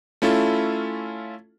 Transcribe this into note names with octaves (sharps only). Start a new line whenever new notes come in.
A3 C#4 E4 F4 A4